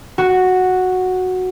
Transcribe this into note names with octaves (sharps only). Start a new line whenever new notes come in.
F#4